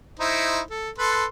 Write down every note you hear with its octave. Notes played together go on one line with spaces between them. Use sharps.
D#4 E4 C5
A4
A4 B4 C6